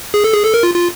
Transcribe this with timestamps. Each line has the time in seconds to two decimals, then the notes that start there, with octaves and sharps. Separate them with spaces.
0.14 G#4
0.24 A4
0.34 G#4
0.45 A4
0.54 A#4
0.63 F4
0.74 F4